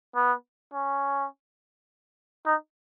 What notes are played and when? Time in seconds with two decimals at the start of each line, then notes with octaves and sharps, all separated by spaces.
0.15 B3
0.73 C#4
2.46 D#4